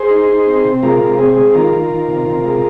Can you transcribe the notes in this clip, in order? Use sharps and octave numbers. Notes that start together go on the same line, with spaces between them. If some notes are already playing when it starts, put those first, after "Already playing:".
Already playing: G#4 C5
D#4
D#4
C4
C3
G#3 F4 A#4
C3
C4 G#4
G#3
D#3 F4 A#4
D#3
D#3
C3
C3
G#3